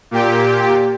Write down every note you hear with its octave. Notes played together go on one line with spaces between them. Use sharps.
A#2 G4